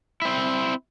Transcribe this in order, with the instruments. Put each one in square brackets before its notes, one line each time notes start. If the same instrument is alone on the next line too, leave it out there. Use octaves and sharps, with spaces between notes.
[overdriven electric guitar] C4 E4